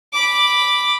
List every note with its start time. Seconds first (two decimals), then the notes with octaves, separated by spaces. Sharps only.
0.13 B5 D6